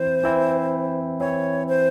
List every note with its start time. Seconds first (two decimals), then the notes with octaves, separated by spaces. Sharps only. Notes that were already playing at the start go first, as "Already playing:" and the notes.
Already playing: E3 C4 E4 C5
0.23 E3 C4 E4
1.20 E3 C4 E4 C#5
1.68 C5